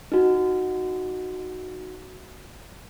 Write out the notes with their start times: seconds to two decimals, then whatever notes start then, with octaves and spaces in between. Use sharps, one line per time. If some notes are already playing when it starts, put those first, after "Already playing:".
0.12 D#4 F#4